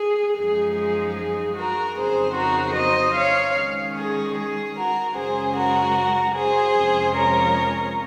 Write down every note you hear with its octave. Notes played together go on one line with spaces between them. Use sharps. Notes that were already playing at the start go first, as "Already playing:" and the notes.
Already playing: G#4
F#2 F3 G#3 D#4 G#4
G#4
G#4
F#4 A#4
F2 C#3 F#3 C4 D#4 G#4 C5
F#4 A#4
C5 D#5
C#5 F5
D#3 G#3 C#4
G#4
G#4
F#4 A#4
F#2 C#3 G#3 C#4 G#4 C5
F#4 A#4
G#4 C5
F2 C3 F3 G#3 C#4
A#4 C#5